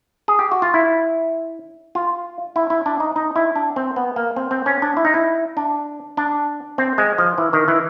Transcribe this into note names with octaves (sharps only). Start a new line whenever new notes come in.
G#4
G4
F#4
F4
E4
F4
E4
E4
D4
D#4
D#4
E4
D4
C4
B3
A#3
C4
C4
C#4
D4
E4
D#4
E4
D4
D4
C4
G#3
F3
E3
D#3
E3